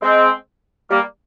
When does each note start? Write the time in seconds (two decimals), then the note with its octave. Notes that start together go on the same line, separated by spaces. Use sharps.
0.03 G#3 C4
0.89 G3 A#3